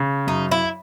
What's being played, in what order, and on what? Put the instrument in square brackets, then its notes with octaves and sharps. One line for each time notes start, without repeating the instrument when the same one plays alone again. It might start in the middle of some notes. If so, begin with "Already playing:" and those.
Already playing: [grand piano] C#3
[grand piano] F#2 [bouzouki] D#4
[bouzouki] E4